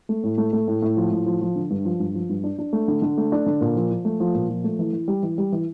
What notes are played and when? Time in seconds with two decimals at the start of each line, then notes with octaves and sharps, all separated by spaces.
0.09 A3
0.23 A2
0.38 A3
0.53 A3
0.68 A2
0.82 A2
0.97 F3
1.12 A2
1.26 F3
1.41 F3
1.56 D3
1.70 G2
1.85 F3
2.00 G2
2.14 F3
2.29 G2
2.44 D4
2.59 D4
2.73 A3
2.88 D3
3.02 D3
3.17 A3
3.32 D4
3.46 D3
3.61 A#2
3.76 F3
3.91 F3
4.05 A3
4.20 F3
4.34 A#2
4.49 F3
4.64 A3
4.79 E3
4.93 E3
5.08 G3
5.23 E3
5.38 G3
5.52 E3